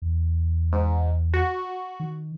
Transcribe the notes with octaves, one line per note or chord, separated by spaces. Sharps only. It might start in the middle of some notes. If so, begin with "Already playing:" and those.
E2
G#2
F#4
D#3